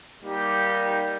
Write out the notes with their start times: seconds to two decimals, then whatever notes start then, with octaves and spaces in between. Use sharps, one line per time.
0.22 G3 A#3 D#4 G4